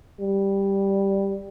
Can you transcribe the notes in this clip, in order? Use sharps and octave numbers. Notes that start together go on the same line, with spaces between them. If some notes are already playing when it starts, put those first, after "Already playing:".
G3